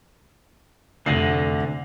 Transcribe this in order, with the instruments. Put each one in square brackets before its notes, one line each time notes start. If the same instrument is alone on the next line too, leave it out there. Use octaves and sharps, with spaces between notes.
[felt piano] F1 A#6 C7 [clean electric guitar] D2 D3